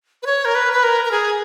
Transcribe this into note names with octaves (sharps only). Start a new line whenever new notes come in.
B4
C#5
A#4
B4
B4
A#4
A#4
G#4